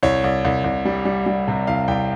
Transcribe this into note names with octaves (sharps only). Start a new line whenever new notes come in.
C2 C#5
C2
C2
C2
G3
G3
G3
C3
C2 F5
C2 G5